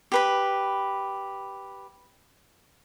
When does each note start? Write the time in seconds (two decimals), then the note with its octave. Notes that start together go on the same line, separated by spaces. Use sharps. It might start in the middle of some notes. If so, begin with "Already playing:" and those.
0.12 G4 B4 B5